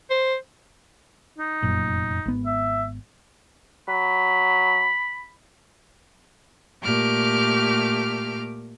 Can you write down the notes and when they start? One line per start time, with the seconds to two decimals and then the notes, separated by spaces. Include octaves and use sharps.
0.10 C5
1.38 D#4
1.63 F1 F#2 A#2
2.25 G#1 B3
2.46 E5
3.89 F#3 B5
6.82 A#2 A3 G4 D6 F6